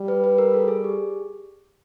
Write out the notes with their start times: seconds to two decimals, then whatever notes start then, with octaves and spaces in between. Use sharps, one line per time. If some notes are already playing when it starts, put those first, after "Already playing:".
Already playing: G3
0.08 B4
0.24 B4
0.38 A#4
0.54 A4
0.68 G#4
0.84 G4